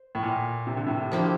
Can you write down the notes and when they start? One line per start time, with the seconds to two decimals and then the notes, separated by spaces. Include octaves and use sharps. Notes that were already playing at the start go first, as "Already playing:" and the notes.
Already playing: C5
0.15 A2
0.23 A#2
0.67 C3
0.77 D3
0.86 A2 C3
1.11 D3 F3 A#3 E4 G4 C5